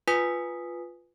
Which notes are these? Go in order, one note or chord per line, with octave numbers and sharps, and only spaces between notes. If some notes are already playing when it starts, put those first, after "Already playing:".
F4 B4 G#5 D#6 B6